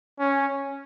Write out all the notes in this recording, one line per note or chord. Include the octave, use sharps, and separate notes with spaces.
C#4